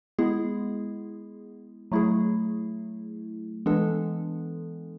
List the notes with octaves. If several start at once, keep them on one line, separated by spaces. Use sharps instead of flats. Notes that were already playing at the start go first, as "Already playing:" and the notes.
G#3 B3 E4 G#4
F#3 A3 E4 G#4
E3 G#3 B3 D4 A4